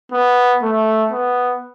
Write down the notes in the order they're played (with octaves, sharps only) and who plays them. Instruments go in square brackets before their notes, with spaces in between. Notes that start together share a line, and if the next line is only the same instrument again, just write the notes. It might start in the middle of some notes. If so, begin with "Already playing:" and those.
[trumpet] B3
A3
B3